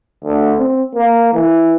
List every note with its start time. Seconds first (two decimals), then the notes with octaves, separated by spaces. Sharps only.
0.25 D2
0.59 C4
0.95 A#3
1.34 E3